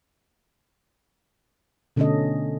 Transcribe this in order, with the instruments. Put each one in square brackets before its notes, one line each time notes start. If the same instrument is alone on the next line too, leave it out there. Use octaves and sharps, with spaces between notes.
[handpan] B2 D3 A3 C#4 A4 D#5